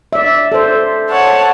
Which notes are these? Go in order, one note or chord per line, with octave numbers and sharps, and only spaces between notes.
D5 E5
A4 C5
C#5 F#5 A5